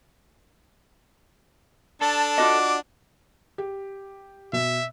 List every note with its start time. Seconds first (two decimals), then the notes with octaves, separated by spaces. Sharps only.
2.02 D4 A4 A5
2.38 F4 F#4 D#5 D6
3.58 G4
4.53 B2 E5